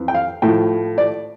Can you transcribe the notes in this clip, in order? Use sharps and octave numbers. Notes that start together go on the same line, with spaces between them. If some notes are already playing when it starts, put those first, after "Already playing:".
Already playing: F2 E3
G5
F5
A2 F3 G5
D5